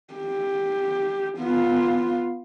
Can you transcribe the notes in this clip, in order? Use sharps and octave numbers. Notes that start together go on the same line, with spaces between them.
G4
B3 F4